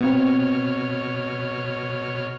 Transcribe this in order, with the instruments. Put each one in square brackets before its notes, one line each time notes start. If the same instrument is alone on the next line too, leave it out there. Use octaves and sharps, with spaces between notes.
[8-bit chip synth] B2 C#5 F6 [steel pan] B3 C4